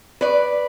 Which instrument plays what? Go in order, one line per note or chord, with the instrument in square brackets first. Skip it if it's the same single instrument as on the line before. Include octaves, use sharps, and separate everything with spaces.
[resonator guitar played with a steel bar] B4 D5